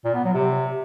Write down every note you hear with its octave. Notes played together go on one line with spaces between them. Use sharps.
A#2
B3
F#3
C3